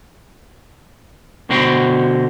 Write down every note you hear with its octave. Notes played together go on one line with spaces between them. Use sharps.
B2 D3 F#4 C5 G5 B5